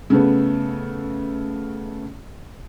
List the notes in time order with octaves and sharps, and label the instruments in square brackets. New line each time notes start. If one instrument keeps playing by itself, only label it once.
[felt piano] C#3 A3 B3